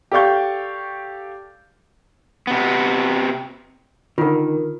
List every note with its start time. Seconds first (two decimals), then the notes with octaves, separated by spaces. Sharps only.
0.12 G4 A4 D5 F5 C#6 G6
2.47 C3 B3
4.18 D3 D#3 F4 A#4